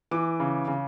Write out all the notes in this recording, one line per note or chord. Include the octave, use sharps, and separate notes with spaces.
E3 D6
C#3
C#3